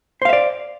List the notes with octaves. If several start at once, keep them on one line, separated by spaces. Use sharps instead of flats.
C5 D5 E5 F5